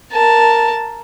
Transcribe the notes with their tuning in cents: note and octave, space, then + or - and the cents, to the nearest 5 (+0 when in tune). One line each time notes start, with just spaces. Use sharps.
A#4 +0 A5 +0